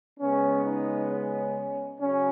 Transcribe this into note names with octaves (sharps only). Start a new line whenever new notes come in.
C#3 G#3 B3 C#4
D#4
C#4
C#3 F#3 C#4